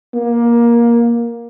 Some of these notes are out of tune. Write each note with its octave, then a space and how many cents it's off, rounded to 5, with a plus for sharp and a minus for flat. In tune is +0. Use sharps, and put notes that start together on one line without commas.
A#3 +15